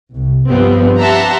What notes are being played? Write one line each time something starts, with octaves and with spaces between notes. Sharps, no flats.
C2
G2 F3 G3 B3 C4
G4 E5 F#5 A5 A#5 C6